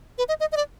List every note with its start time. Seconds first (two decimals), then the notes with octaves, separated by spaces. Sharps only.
0.18 B4
0.29 D#5
0.40 D#5
0.52 D#5
0.57 D5